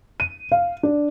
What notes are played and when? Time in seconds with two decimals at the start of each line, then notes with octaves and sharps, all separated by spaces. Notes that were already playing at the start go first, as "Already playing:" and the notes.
0.20 D#7
0.52 F5
0.83 D4